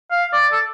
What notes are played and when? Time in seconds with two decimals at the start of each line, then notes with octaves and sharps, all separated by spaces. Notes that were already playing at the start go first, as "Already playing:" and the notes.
0.11 F5
0.33 D5
0.52 A4